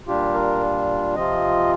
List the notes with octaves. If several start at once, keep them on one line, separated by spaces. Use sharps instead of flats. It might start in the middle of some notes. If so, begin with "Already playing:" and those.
A#2 G3 D4 F4 G4
A#4
C3 F3 C4 F4 D#5